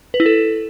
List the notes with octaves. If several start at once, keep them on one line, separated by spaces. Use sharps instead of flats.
B4
E4
A4